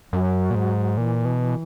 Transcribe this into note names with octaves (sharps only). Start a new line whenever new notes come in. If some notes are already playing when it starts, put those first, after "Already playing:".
F#2 F#3
A#2
G#2
A#2 E3
B2